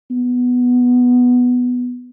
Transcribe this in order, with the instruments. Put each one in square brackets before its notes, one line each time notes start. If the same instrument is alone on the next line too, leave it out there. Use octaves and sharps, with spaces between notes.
[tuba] B3